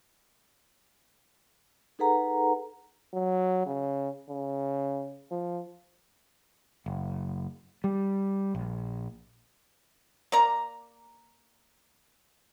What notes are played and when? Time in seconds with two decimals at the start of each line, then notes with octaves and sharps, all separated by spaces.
1.99 D#4 G#4 A4 B4 F#5 A#5
3.14 F#3
3.66 C#3
4.30 C#3
5.31 F3
6.86 F#1
7.84 G3
8.55 A#1
10.32 A#3 D5 A#5